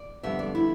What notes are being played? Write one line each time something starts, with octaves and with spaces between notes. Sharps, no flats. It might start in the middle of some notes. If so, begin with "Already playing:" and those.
Already playing: D5
F2 D3 G3 B3 E5
D5
E4